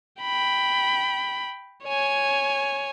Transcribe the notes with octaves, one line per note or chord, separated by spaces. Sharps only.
G5 B5
C#5 G#5